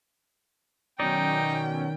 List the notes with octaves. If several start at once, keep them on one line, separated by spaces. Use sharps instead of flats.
B2 D#3 F#3 C#4 D#4 D5 G5